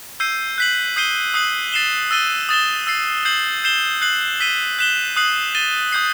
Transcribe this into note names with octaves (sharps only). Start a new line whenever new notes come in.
E6 G6 C7 D#7
F#6 B6 F#7
D#6 G6 C7 D#7 G7
D#6 F#6 C7 F#7
A6 C7 E7 G7
E6 A6 D#7 G7
D#6 A6 E7 G7
E6 A6 C7
G6 C7 F#7
G6 C7 E7 G7
F#6 C7 F#7
E6 B6 D#7 G7
F#6 B6 E7 G7
D#6 F#6 C7 F#7
A6 D#7 G7
D#6 G6 C7